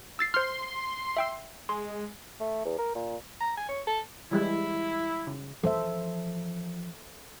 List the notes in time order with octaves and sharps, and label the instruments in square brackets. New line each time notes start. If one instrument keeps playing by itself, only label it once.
[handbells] E6 A6 C7
[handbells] C5 F6 [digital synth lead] C6
[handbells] E5 G5 E6
[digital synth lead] G#3 [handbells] C6
[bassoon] A3
E2
A#4
A#2
[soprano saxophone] A#5
G#5
C#5
A4
[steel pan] E3 G3 G#3 [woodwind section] E4
[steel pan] C#3
[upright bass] E3 F3 [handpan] A4 C5 E5